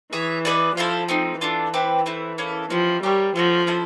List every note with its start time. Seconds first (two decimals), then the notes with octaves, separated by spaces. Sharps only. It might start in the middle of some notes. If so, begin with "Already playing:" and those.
0.13 E3 G#4 C#5 E5
0.45 D#4 G#4 B4 D5
0.76 F3 E4 A4 C5 F5
1.09 A3 C4 D#4
1.41 E3 A3 D4 F4
1.74 C4 E4 G4 B4
2.06 A3 C4 E4
2.38 A#3 C#4 E4 A4
2.70 F3 C#4 E4 G4
3.03 G3 G4 A#4 C#5
3.36 F3 A3 C#4 F#4
3.67 C#4 E4 A4 C5